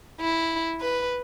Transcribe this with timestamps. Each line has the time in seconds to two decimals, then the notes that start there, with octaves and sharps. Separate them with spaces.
0.20 E4
0.81 B4